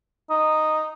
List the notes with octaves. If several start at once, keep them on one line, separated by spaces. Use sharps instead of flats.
D#4